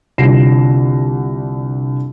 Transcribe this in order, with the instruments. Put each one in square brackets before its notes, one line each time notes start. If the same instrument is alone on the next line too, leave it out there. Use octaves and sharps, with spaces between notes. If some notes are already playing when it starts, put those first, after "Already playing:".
[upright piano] C2 D3 F4 A#6 C7 E7